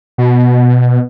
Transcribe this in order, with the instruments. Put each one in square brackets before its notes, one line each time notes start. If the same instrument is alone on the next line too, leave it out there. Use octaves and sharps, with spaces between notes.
[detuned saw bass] B2